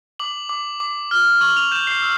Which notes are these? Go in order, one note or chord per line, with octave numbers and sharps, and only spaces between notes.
D6 F#7
D6
D6
F6
C#6 F#7
F7
G6 E7
C7
E6